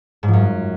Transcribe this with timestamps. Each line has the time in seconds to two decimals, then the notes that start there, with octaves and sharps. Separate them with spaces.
0.23 G#2
0.28 F3
0.33 F#2